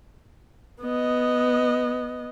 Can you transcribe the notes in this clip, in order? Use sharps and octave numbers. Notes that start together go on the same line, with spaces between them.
B3 D#5